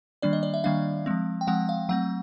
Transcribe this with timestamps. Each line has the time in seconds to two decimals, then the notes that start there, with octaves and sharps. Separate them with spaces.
0.22 D#3 G3 A#3 D4 D5
0.33 D#5
0.43 D5
0.54 E5
0.64 D#3 G3 A#3 D4 F5
1.06 F3 G#3 C4
1.41 G5
1.47 F3 G#3 C4 F#5
1.69 F5
1.89 F#3 A3 C4 F#5